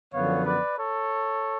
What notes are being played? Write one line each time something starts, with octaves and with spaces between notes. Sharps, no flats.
F#2 D3 F3 B3 C#5 F5
B4 D5
A4 C#5